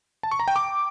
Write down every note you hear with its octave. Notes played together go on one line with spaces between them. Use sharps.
A5
C#6
A#5
G5
D6